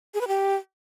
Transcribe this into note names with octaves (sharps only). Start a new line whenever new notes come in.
G#4
B4
G4